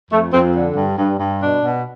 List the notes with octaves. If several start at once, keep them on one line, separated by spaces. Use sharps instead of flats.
F2 A3
F2 C4
D3
G2
G2
G2
B2 D4
B2